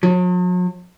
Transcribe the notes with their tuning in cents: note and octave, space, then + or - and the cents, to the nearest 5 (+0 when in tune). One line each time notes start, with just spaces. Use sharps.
F#3 -45